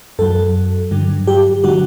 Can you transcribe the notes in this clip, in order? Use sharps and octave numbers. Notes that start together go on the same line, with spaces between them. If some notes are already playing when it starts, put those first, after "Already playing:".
F#2 F#3 A4
G2 D3 F#3
G4
D3 F#3 F#4